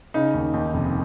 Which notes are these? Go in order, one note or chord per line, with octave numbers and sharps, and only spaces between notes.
C#3 D#4
D#2
D#2
F1